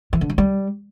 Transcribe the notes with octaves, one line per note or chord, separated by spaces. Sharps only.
E3
D3
F#3
G3